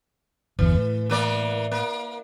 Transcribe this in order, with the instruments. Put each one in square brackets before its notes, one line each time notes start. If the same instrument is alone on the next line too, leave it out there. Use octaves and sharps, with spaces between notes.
[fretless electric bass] G1 E2 [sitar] E3
[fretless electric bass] A2
[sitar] E3 A#3 D5
A#3